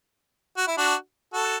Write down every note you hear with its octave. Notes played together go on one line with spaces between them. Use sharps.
F#4
E4
D4 F#4
F#4 A4